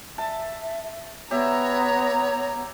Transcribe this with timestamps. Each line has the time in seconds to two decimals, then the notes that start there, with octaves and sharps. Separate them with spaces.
0.18 E5 A5
1.31 B3 G4 C#5 E5 A#5